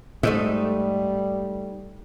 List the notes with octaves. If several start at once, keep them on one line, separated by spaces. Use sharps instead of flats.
G#2 G3 A3 D#4 E5